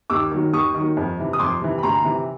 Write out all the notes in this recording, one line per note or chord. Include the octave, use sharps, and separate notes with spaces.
D#2 D6 E6
D#3 F#3
D#2 C#6 D#6
D#3
F#3
F2
C3 E3
D#6
F2 C6 D6
C3 E3
B5
D2 A#5 C6
C3 E3